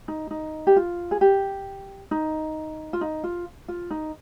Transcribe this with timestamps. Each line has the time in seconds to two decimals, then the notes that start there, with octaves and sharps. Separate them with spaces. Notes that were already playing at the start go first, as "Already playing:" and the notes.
0.08 D#4
0.31 D#4
0.67 G4
0.76 F4
1.11 G#4
1.21 G4
2.11 D#4
2.93 F4
3.01 D#4
3.24 F4
3.68 F4
3.91 D#4